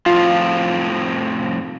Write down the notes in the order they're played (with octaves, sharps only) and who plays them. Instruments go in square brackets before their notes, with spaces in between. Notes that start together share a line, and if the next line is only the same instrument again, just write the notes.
[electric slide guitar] F2 A2 F3 [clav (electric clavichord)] F4